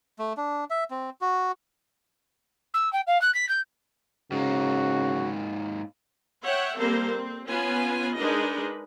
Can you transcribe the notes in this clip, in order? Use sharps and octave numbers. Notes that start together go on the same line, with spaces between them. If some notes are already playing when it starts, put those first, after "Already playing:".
A3
D4
E5
C4
F#4
E6
G5
F5
F#6
B6
G6
G#2 C#3 A#3 F#4
C#5 E5 F#5 G5
G3 A#3 C4 A4 A#4 C5
C4
B3 C#4 F4 B4 G#5
G#3 D4 D#4 A#4 B4 D#5